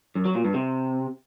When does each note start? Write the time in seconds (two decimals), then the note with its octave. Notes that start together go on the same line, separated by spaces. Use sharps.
0.15 F#2
0.25 F#3
0.35 A#2
0.45 G2
0.54 C3